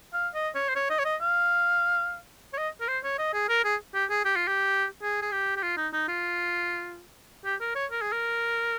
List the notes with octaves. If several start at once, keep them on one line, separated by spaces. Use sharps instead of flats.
F5
D#5
C#5
C5
C#5
D#5
C#5
D#5
F5
C#5
D#5
A#4
C5
C#5
D#5
G#4
A#4
G#4
G4
G#4
G4
F4
G4
G#4
G#4
G4
G4
F4
D#4
D#4
F4
G4
A#4
C#5
A#4
G#4
A#4